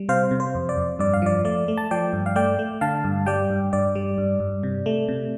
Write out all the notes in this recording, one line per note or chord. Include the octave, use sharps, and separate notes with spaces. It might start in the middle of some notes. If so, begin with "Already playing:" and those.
Already playing: G3
C3 C5 F5
C3
C5
F2
D5
F2
G2 D5
F5
F3 D5
A3 D5
A3
A5
F3 D5 G5
G2
F5
A3 D5 G5
A3
D3 F5 A5
G2
G3 D5 G5
G2
G2 D5
G3
G2
G2
C3
A3
C3